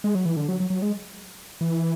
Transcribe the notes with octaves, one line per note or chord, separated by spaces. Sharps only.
G#3
F#3
E3
D3
F#3
F#3
F#3
G#3
E3